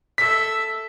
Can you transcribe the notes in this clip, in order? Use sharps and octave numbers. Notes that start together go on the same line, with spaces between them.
A4 E5 B6